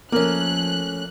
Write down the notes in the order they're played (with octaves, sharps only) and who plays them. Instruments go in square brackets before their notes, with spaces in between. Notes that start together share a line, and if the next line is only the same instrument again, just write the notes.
[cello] F3 [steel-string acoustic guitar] A3 C#4 [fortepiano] A#3 [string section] F#6